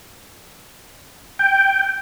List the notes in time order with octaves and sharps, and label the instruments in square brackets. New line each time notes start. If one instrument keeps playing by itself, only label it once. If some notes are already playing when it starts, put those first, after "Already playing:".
[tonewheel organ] G5